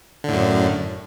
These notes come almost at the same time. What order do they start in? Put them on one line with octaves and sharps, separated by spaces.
D3 A2 F#2